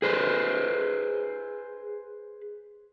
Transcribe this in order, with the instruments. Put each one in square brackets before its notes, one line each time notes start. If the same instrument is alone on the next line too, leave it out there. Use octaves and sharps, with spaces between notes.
[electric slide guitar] G#4 B4 C5